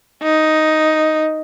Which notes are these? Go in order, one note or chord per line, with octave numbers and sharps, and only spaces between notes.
D#4